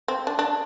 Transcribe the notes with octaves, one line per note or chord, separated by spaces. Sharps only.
C4
D4
D4